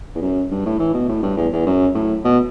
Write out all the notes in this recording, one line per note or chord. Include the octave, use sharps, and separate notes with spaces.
E2
F#2
G2
A2
E3
B2
A2
G2
E2
E2
F#2
A2
B2